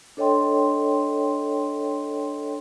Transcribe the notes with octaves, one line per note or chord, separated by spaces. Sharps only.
D4 A4 C#5 D#5 G5 C6